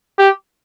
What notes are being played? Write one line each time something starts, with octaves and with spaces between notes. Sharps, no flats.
G4